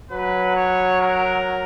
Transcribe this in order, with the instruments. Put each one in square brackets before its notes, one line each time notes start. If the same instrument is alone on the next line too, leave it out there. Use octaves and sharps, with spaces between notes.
[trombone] F#3 [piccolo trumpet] B4
[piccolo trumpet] C#5
A#4